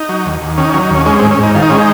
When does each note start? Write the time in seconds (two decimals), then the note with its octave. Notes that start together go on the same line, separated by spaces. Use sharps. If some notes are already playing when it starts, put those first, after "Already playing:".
Already playing: D#4
0.09 F#3
0.26 D#2
0.41 D#2
0.58 D#3 C#4
0.64 D#4
0.70 C#4
0.74 F#3
0.82 D#4
0.91 D#2 C#4
1.06 G#3 C#4
1.19 C4
1.23 G#2
1.31 C#4
1.39 G#2 D#4
1.55 D#3 F4
1.63 D#4
1.69 G#3 C#4
1.78 D#4